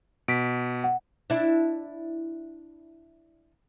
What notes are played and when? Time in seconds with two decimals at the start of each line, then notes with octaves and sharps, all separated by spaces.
0.28 B2 B6 D7
0.84 F#5
1.30 D4 E4